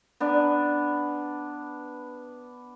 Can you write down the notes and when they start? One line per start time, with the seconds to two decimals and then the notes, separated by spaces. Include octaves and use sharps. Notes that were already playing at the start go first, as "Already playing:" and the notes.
0.20 B3 D4